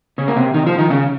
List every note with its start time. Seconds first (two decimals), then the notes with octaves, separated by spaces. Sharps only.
0.18 C#3 C#4
0.28 A#3
0.36 C3 C4
0.54 D#3 D#4
0.66 F3 F4
0.78 D#3 D#4
0.90 C#3 C#4